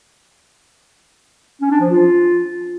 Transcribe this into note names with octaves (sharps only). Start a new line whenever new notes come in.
C#4
D4
F3
F4